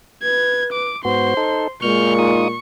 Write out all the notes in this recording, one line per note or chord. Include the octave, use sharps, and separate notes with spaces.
B4 G#6
D6
G#2 B3 F#4 C5 C6
D#4 A4
A#2 G#3 C#6 F6 G6
D#4 F4 D#6